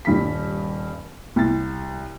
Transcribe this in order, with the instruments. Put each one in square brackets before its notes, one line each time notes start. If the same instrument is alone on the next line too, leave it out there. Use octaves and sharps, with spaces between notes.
[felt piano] D#1 G2 B5 B6
C2 A6